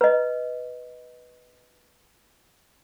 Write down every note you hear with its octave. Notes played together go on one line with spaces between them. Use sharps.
B4 D#5